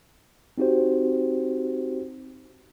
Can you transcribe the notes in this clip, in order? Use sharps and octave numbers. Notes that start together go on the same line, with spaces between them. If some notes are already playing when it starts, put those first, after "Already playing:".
C4 D#4 F#4 G4 C5